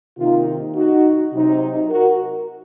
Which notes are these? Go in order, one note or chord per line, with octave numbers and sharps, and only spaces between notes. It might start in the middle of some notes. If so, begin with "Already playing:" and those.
C3 D#3 A#3 D#4 F4
D#4 F#4
C3 F#3 C4 D#4
F#4 A#4